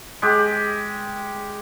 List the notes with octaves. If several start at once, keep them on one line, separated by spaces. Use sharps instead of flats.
G#3 G4